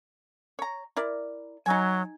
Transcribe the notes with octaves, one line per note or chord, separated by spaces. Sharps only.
C#5 A#5
E4 A#4 D5
F#3 D#4 G#5